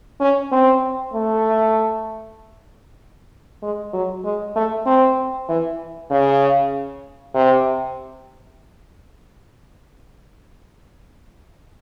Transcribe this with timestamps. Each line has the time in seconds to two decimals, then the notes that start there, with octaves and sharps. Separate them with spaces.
0.21 C#4
0.52 C4
1.14 A3
3.62 G#3
3.93 F#3
4.24 G#3
4.56 A3
4.86 C4
5.49 E3
6.11 C#3
7.35 C3